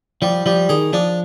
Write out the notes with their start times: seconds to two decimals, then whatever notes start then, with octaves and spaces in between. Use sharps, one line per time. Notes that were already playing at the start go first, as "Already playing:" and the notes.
0.22 F3 G3
0.46 F3 G3
0.69 D#3 G#4
0.93 F3 D4